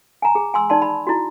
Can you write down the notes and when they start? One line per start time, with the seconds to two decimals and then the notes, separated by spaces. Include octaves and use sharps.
0.22 G#5 A#5
0.35 G#4
0.54 G#5 C6 E6
0.70 D#4 D5 A5 C6
0.82 B5
1.07 E4 F#4